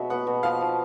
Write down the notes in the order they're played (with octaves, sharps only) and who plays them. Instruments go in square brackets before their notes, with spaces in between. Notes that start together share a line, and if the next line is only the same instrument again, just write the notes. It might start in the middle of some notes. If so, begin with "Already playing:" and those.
Already playing: [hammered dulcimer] B2 F#3 [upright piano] E5
[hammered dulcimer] B3 [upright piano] F#5
[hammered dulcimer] B2
[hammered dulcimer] F3 [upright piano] F5
[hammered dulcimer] F3